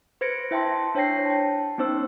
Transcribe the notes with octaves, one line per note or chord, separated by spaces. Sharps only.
B4 C5 G#6 A#6 C#7 D7
E4 E5 G5 A5 C6
D4 C5 C#5 G5 A#6 C7
G5 A5
B3 C#4 D#4 C5 E6